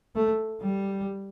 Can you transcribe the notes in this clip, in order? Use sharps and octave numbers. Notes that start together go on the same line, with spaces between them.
A3
G3